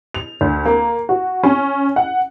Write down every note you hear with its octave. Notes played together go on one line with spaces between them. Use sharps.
F7
D2
A#3
F#4
C#4
F#5